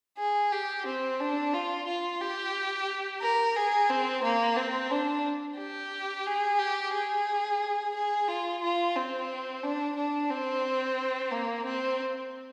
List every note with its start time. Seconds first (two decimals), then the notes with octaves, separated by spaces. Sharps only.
0.18 G#4
0.53 G4
0.86 C4
1.20 D4
1.54 F4
1.88 F4
2.21 G4
3.22 A#4
3.57 G#4
3.89 C4
4.23 A#3
4.57 C4
4.91 D4
5.58 G4
6.26 G#4
6.59 G4
6.94 G#4
7.95 G#4
8.28 F4
8.61 F4
8.96 C4
9.63 D4
9.96 D4
10.30 C4
11.31 A#3
11.66 C4